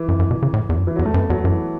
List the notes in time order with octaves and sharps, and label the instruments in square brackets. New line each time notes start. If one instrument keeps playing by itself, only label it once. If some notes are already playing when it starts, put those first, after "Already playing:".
Already playing: [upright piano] E3
[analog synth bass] F#2
F#2
B2
C#3
A2
E2
F#2
[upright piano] E3
[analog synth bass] E2 [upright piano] F#3
[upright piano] A3
[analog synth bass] F#2 [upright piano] B3
[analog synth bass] E2 [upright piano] F#3
[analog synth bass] F#2 [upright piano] E3